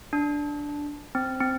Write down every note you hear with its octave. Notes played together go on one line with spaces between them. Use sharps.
D4
C4
C4